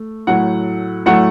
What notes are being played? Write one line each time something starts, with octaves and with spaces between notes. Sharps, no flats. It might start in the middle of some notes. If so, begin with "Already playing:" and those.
Already playing: A3
A2 F#3 A3 F#5
A2 F#3 A3 F#5